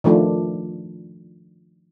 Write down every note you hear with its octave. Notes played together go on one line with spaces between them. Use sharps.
D#3 F3 A3 D4